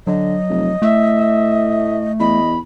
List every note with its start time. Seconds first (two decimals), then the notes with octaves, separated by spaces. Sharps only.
0.07 D3 F#3 D#5
0.49 F1
0.82 A2 A3 E5
2.19 E2 D#5 B5